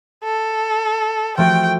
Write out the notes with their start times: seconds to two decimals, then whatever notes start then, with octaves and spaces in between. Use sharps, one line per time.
0.24 A4
1.38 F3 A3 F#4 G5